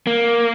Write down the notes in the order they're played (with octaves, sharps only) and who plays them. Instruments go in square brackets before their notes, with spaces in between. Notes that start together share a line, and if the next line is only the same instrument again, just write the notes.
[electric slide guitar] A#3